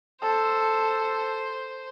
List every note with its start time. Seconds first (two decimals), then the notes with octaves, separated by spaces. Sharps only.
0.22 A4 C5